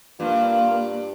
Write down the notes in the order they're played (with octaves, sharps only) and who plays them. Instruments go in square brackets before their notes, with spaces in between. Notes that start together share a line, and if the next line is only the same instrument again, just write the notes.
[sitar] G2 [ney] A#3 [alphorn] F4